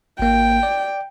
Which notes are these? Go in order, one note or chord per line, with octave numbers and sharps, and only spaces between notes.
G#1 A#3 G5
D5